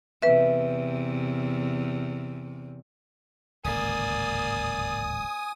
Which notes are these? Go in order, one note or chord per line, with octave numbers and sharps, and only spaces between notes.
E2 C3 B4 E5
D1 G#1 C#2 A#3 D5 G#5 D#6